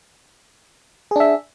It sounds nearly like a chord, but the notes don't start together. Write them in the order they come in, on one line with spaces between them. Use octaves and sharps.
G#4 D4 E5